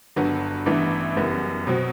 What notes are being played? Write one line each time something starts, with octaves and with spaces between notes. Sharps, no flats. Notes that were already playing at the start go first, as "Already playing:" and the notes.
G1 G2 F#3 B3 F#4
A1 G2 E3 B3 E4
F#1 F#2 E3 G3 B3
B2 F#3 C4 F#4